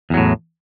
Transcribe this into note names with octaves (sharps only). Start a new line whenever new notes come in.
E2 A2 F#3